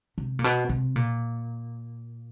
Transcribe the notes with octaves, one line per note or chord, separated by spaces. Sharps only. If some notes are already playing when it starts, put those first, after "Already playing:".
C3
A#2
B2
C3
A#2